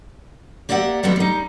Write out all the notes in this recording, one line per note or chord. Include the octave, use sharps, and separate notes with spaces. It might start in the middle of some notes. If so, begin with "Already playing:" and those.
A#3 G4 D5 E5 F#5
D#2 G3 B3 C4 A4
G3 D#4